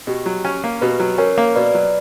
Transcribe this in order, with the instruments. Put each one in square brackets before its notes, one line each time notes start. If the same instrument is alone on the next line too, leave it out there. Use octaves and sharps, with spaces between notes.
[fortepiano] B2 [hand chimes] G4
[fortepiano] F#3
C#4
A#3
[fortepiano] B2 [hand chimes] G4 B4
[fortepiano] F#3
[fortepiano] C#4 [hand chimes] A#4 C#5
[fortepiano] A#3
[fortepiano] B2 [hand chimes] B4 D5
[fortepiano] F#3